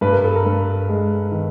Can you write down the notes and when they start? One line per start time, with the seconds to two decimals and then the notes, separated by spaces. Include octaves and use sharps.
0.01 G2 B4
0.13 A#4
0.24 A4
0.35 A#4
0.45 G2
0.89 G#3
1.32 D#3